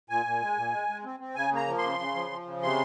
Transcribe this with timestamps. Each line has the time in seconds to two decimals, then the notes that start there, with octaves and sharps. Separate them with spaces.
0.09 A#2 G#5
0.26 A#2
0.41 G#3
0.57 A#2
0.73 G#3
0.89 G#3
1.04 C4
1.20 C4
1.35 C#3 G#5
1.52 A#3 A#5
1.67 F3
1.78 C#3 C6
1.99 C#3
2.15 F3
2.31 F3
2.46 C#3
2.62 C3 C6